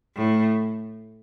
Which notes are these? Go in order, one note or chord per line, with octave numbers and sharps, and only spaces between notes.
A2